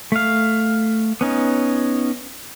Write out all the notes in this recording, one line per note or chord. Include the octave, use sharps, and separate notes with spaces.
A3 F5
B3 C#4 D#4